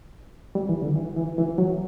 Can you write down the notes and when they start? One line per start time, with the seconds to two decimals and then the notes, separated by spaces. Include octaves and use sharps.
0.55 G3
0.69 E3
0.82 D3
0.96 E3
1.16 E3
1.38 E3
1.58 F#3